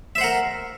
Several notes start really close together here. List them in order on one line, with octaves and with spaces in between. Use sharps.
E5 C5 F#5 A#4